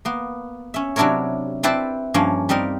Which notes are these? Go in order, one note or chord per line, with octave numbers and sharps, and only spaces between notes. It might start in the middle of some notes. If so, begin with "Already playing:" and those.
A#3 B3
C#4 E5
C3 F#3 D4 E4 A#4 C#5
C4 E4 B4 C5 D5 A5
G2 F3 A#3 C#4
G3 C4 D#4 A#4